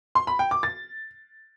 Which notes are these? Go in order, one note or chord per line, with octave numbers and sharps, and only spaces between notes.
C6
B5
G5
D6
A6